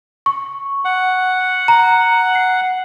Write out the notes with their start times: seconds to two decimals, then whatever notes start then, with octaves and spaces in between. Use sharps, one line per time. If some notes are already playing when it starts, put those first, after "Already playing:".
0.26 C#6
0.85 F#5
1.68 A#5
2.35 C7